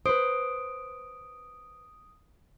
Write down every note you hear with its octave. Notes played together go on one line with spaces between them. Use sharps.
B4 C5 D#6 D7